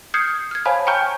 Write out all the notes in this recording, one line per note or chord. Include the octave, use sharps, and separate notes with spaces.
D#6 F6 G6 G#6 C7 C#7
F6 G#6
C5 C#5 F5 G#5 A5 B5
G5 G#5 A#5 C#6 F6 G6